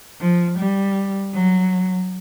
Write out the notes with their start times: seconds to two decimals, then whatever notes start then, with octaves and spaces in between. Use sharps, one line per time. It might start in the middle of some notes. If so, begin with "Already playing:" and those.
0.21 F3
0.59 G3
1.34 F#3